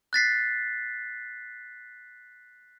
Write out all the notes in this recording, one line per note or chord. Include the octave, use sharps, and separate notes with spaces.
F#6 A6 B6 C7